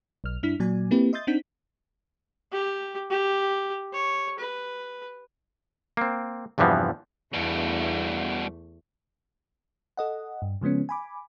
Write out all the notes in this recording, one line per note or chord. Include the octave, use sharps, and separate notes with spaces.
B1 F6
G2 D4 E4 F6 B6
A#2 F#3 D5 G#5
A#3 C4 E4 G4 B4
D#5 E5 C6 D#6 G6 A6
C4 D4 D#4 F#5 G6 B6
G4
G4
C#5
B4
A#3 C4
E2 G2 C3 E3 F3 B3
E2 G2 B2 A3
A4 D#5 F#5
G2
C#3 F3 G#3 B3 C#4
G#5 B5 D6